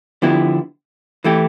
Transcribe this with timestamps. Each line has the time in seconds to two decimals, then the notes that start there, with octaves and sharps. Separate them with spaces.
0.22 D3 F3 B3 E4 G4
1.24 E3 A3 E4 G4